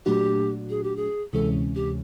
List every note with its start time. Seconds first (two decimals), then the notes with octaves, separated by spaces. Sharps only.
0.06 A#2 F#3 A3 D4 F#4 G4
0.70 G#4
0.83 G4
0.96 G#4
1.33 D2 C3 E3 G#3 C#4 A4
1.75 G4